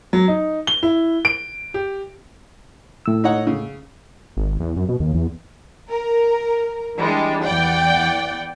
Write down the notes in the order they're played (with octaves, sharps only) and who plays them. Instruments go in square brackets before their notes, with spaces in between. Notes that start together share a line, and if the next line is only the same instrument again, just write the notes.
[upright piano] F#3
D#4
G7
E4
D7
G4
[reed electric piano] A2 E6
[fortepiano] D#4 C#5 F#5
C#3
[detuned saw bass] G#1
E2
F#2
B2
D#2
E2
[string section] A#4
E3 G3 G#3 D4
E2 E3 D5 F#5 G5